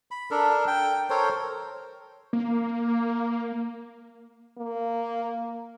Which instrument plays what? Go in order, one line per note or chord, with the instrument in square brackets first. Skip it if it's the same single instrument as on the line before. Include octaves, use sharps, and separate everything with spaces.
[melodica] B5
D4 A4 A#4
G5
A4 A#4 C5 C#5
[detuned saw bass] A#3
[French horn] A#3